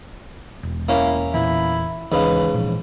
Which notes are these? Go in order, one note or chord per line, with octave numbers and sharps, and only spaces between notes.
E1
A#3 C#4 E4
E2 A#2 E3 E4
G#1 D#2 G#2 C#3 E3 B4
A#2 E3 F3